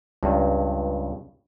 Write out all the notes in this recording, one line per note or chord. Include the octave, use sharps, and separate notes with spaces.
C#2 G2